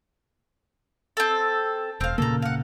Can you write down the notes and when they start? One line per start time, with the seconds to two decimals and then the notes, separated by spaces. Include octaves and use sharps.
1.17 C4 A4
2.01 E1 C4 F5
2.18 A#2 C#3 A#3 A4 A#5
2.42 F5 F#5